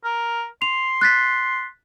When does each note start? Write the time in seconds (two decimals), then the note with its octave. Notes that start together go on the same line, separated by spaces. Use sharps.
0.04 A#4
0.62 C6 F7
1.01 F#6 A6 B6